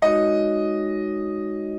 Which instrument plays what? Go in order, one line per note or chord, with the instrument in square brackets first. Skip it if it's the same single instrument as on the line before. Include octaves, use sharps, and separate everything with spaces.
[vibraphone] G#3 D#4 F#4 C#5 [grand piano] D#5